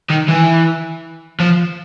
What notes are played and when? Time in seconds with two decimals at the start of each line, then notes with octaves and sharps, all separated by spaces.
0.10 D#3
0.29 E3
1.40 F3